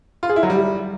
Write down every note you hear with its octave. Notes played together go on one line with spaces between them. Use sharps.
F4
G#4
E4
F#3
G3